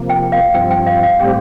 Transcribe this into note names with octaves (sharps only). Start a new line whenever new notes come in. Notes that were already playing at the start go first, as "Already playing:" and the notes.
Already playing: C3 F3 A#3
G5
F5
G2 F3 C4 G5
G5
F5
F5
A2 G3 C4 G4 G5